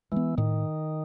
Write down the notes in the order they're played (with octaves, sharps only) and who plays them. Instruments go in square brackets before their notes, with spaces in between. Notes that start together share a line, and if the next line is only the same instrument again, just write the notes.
[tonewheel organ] E3 [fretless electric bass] G#3 B3
[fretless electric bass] A2 [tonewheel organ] D#3